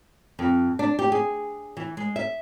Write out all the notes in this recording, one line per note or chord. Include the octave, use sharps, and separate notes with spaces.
F2
D4
G4
G#4
E3
G#3
E5